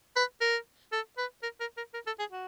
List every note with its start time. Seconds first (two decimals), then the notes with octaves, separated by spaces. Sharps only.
0.16 B4
0.41 A#4
0.93 A4
1.18 B4
1.43 A#4
1.61 A#4
1.77 A#4
1.94 A#4
2.07 A4
2.19 G#4
2.32 F#4